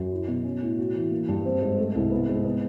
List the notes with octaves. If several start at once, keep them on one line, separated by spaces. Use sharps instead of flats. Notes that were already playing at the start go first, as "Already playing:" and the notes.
Already playing: F#2
E4
B2
C#4
A2
F#4
E3
A#3
G2
C4
G#2
A3
C2
B3
G#2
B3